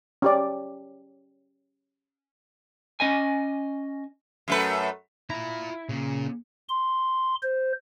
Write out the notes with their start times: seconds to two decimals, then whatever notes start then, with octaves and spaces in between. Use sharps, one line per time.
0.22 C#4 G4 D5
3.00 C#4 D#5 G#5
4.48 F#2 A3 B4
5.30 E4 F4 A#5
5.89 A#2 C#3
6.69 C6
7.43 C5